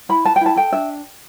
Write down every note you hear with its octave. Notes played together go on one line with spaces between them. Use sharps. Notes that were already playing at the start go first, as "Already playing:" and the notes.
E4 B5
B4 A5
G5
E4 A5
A4 G5
D4 E5